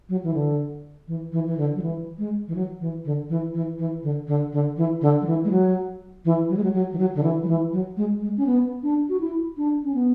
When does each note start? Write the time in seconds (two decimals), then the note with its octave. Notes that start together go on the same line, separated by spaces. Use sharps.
0.09 F#3
0.23 E3
0.34 D3
1.08 E3
1.32 E3
1.47 E3
1.57 D3
1.75 F#3
1.82 E3
2.18 G#3
2.48 E3
2.55 F#3
2.81 E3
3.05 D3
3.29 E3
3.54 E3
3.78 E3
4.03 D3
4.27 D3
4.53 D3
4.77 E3
5.01 D3
5.21 F#3
5.26 E3
5.44 G#3
5.51 F#3
6.25 E3
6.50 F#3
6.57 G#3
6.64 F#3
6.74 F#3
6.92 E3
6.98 F#3
7.15 D3
7.23 E3
7.43 F#3
7.48 E3
7.73 F#3
7.97 G#3
8.21 G#3
8.37 C#4
8.46 B3
8.83 D4
9.09 F#4
9.20 E4
9.57 D4
9.84 C#4
9.95 B3